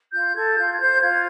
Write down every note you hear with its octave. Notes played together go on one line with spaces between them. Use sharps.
F4 G6
A4 G#6
F4 G6
G#6
C5 G6
F4 G#6